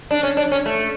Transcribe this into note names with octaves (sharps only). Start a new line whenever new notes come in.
D4
C#4
D4
C#4
A3